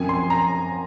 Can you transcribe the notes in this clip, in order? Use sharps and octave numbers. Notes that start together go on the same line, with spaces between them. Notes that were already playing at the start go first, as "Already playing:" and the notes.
Already playing: F#2 F3 C4 G#5
C6
A#5